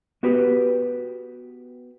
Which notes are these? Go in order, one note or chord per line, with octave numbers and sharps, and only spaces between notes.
B3 F#4 G4 B4